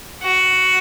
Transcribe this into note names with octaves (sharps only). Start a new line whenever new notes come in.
F#4